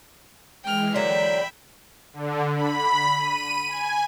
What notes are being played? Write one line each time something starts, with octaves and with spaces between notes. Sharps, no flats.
E3 G#3 G5 F6
D3 F#3 A#3 E5 G5 B5
D3
B5
D#7
G#5